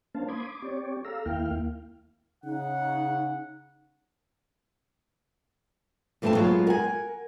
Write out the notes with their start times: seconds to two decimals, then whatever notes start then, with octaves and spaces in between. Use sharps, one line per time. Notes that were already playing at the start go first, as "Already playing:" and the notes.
0.15 A#3 C#4 D4 C5 F5 A5
0.28 B5 C6 D6 D#6 G#6
0.48 D6
0.62 C4 G4 C#5 D5
1.05 A4 F5 A#5 E6
1.25 D#2 A#3 E4 F5 G5 F6
2.45 C#3 D#4 F#5
6.22 G2 E3 A3 A#3 C4 A5
6.35 F#3 G#3 B3 F4 F#4
6.67 A#4 F#5 G#5